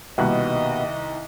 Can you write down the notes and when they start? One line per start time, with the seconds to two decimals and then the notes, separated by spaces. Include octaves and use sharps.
0.18 C2 B2 D#3 G3 A#3 D#4 D#5 F#6